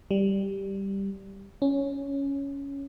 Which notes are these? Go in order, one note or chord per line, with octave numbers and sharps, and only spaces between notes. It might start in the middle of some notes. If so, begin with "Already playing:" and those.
G3
C#4